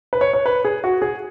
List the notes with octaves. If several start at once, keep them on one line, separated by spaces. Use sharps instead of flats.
B4
C#5
C#5
B4
G#4
F#4
G#4